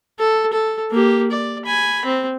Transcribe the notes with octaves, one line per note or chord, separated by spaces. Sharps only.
A4
A4
A#3 G4
D5
G#5 B5
C4